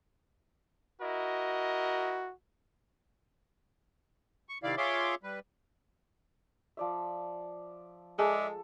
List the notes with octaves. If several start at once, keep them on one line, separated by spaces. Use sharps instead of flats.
E4 F#4 A#4 D#5
C#6
C3 D#3 E4 D5 F5
F4 G#4 C#5 E5 C6 D6
G3 B4
F3 D5 E5
G#3 G#4 A4 D5 E5 G#5